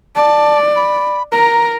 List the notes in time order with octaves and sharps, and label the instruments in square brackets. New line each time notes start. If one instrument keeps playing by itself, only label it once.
[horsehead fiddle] D5 [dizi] A5
[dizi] B5
[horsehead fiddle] A#4 [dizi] A#5